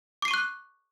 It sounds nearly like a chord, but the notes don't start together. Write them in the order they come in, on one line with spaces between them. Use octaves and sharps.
D6 C7 D#7 C#6 F#6